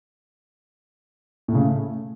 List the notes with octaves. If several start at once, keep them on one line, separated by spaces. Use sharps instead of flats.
A2
C#3
A3